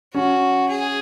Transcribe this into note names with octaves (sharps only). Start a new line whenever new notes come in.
C#4 F#4
G#4